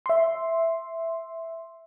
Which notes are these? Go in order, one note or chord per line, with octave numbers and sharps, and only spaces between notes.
E5 C6